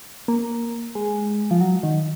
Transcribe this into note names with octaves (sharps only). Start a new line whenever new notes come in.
A#3
G#3
F3
F#3
D#3